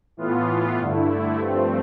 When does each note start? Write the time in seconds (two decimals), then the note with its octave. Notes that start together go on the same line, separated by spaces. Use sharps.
0.17 A2 E3 B3 F4
0.79 G2 D3 A3 E4
1.40 G2 F3 A3 C4